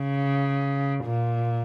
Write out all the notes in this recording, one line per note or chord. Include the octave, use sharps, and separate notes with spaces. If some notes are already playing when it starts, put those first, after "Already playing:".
Already playing: C#3
A#2